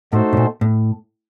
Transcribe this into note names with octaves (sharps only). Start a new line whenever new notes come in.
A2 A3 D#4 F#4 A4 C5
A2
A#2
A2